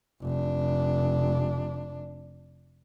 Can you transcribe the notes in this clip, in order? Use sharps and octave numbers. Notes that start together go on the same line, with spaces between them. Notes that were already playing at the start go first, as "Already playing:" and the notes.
F1 D4